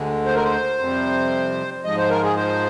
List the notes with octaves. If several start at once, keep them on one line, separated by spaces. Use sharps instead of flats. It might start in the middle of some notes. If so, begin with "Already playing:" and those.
Already playing: D2 D3 G#3
C5
A#4
C5
F2 C3 G3
G#2 F3 G#3 D#5
C5
A#4
G#4
C5